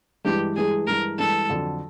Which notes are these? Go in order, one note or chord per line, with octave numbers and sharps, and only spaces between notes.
G2 E3 G#3 G4
G2 E3 G#3 G#4
G2 E3 G#3 A#4
G2 E3 G#3 A4
F2 D3 F#3